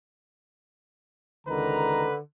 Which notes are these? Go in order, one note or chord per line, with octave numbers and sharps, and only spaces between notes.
C#2 D3 D#3 B4 A#5